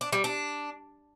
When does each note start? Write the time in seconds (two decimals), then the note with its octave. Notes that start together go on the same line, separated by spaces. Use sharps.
0.01 D4
0.13 G3
0.24 D4